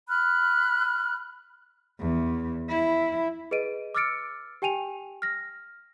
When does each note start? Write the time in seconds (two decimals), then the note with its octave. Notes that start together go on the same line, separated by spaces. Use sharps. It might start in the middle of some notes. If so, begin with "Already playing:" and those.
0.08 B5 F6 F#6
2.00 E2
2.69 E4
3.51 G#4 B4 D#5 D7 D#7
3.95 D6 E6 F6 A6 C#7 D7
4.62 G4 G5 G#5 D#7 F7
5.22 F6 A#6